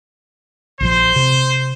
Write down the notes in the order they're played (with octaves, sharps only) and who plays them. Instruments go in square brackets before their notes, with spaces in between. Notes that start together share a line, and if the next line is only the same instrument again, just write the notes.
[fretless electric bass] A#1 A#2 F3 [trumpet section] C5
[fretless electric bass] C3